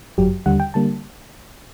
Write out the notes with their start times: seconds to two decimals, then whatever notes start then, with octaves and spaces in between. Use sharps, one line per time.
0.18 G1 F#2 F#3 G4
0.46 D#2 D3 G3 F#5
0.60 G5
0.74 D3 G3 A#3 A5